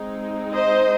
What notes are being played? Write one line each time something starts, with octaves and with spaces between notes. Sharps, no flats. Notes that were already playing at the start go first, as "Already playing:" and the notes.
Already playing: G#3 C4 D#4
C5 D#5